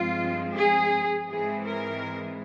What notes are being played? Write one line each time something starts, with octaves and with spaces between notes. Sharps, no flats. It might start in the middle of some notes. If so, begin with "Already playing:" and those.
Already playing: G2 F3 G#3 C4 F4
G#4
G#2 E3 G#3 C4 G#4
A#4